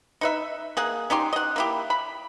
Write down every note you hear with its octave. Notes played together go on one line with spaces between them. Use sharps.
D#4 B4 E5
A#3 G#4 F#5
C#4 D#4 G4 C6
D#5 F#5
A#3 E4 G4
B5